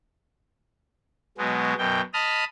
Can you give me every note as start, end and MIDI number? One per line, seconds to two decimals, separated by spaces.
1.38 1.74 47
1.38 1.74 54
1.38 1.74 56
1.38 1.74 59
1.78 2.01 42
1.78 2.01 47
1.78 2.01 79
2.14 2.44 75
2.14 2.44 81
2.14 2.44 83
2.14 2.44 87
2.14 2.44 89